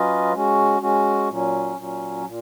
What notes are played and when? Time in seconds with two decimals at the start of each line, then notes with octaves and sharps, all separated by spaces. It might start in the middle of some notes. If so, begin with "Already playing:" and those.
Already playing: F#3 C#4 F4 B4 D#5
0.33 G#3 C#4 F#4
0.81 G#3 C#4 F#4
1.29 A#2 F#3 C#4
1.77 A#2 F#3 C#4
2.26 A#2